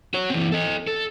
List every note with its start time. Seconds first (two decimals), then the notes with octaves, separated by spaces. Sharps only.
0.14 F#4 C#5
0.30 E3 C4
0.52 A4 D#5
0.87 A4